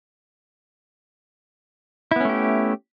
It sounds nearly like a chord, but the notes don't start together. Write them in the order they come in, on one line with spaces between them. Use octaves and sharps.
E4 B3 C#4 A3 G4